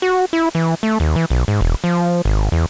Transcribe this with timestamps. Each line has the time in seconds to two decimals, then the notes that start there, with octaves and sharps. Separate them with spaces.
0.02 F#4
0.33 E4
0.55 E3
0.83 A3
1.00 D#2
1.16 E3
1.30 B1
1.48 G#2
1.61 E1
1.84 F3
2.25 G#1
2.52 E2